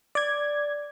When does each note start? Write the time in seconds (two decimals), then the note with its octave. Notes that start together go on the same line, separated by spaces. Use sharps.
0.15 D5 G#6